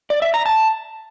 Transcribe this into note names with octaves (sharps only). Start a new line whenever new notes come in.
D5
E5
A#5
A5